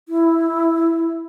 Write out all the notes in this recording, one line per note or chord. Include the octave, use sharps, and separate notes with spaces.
E4